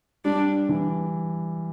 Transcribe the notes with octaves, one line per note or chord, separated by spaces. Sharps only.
G3 D4
E3